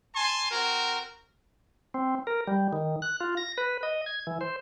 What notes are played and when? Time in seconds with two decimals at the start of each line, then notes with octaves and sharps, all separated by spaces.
0.16 G#5 A5 C6
0.51 C4 F#4 A#4
1.94 C4
2.27 A#4
2.47 G3
2.73 D#3
3.02 F#6
3.21 F4
3.37 A#6
3.58 B4
3.83 D#5
4.06 G#6
4.27 E3
4.41 C5